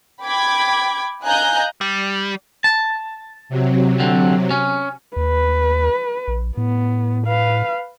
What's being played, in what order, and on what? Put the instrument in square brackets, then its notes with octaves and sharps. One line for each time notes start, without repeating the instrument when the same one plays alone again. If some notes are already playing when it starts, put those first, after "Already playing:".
[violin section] G5 B5 D6 G#6
D#5 F5 G#5 A#5 F#6 G6
[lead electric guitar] G3
[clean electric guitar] A5
[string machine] C3 F#3
[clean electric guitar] D3 C4
C#4
[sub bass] D#2 [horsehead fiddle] B4
[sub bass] A#1
[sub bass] A2 [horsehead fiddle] B3
[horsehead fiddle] B4 F5